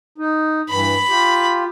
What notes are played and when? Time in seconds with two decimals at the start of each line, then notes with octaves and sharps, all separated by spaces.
0.18 D#4
0.70 G2 E3 B5
1.09 F4 G4